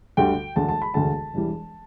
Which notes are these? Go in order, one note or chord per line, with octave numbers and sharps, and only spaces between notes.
D2 D3 G3 G5
E1 D2 D3 A5
A5
B5
E1 D2 D3 A5
E1 E2 E3 G3